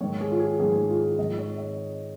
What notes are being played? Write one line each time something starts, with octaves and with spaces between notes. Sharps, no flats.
G#2 D#3 C#5
G#4
F4
G#4
G#2 D#3 G#4
G#4
F4
G#4
G#2 D#3 D#5
C#5
D#5